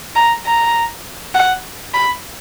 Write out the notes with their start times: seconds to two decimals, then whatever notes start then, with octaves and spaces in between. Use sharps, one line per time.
0.16 A#5
0.45 A#5
1.35 F#5
1.94 B5